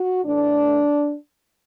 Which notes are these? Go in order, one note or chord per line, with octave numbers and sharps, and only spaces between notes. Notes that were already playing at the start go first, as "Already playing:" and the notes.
Already playing: F#4
A2 E3 A3 D4